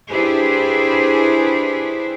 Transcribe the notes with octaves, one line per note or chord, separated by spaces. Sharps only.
D4 E4 G4 G#4 B4 C5